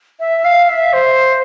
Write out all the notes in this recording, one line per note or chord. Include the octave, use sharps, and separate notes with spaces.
E5
F5
E5
C5